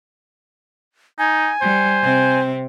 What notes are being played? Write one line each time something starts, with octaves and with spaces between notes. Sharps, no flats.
D#4 G#5
G3 C5
C3 C4